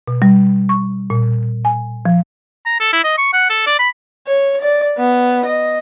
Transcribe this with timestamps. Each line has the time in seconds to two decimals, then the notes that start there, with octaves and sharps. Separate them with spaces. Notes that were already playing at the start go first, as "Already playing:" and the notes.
0.08 B2
0.22 G3
0.69 C#6
1.10 A#2
1.65 G#5
2.05 F3
2.66 A#5
2.80 A4
2.93 E4
3.04 D#5
3.18 C#6
3.33 F#5
3.50 A4
3.66 D5
3.79 B5
4.27 C#5
4.61 D5
4.98 B3
5.45 D#5